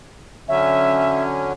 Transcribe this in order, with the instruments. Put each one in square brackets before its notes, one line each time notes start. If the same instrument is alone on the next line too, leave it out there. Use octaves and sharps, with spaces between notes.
[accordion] D3 F#3 C#4 [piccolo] E5